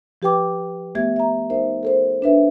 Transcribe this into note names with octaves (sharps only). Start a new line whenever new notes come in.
F3 G4 B4 G5 D6
A3 B3 G4 E5 G#6
E5 A#5
D#4 A#4 C5 E5
A4 A#4 C5
D4 B4 E5